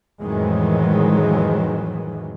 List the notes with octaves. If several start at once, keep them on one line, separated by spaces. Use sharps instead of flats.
F2 A2 D#3 E3 F#3 G#3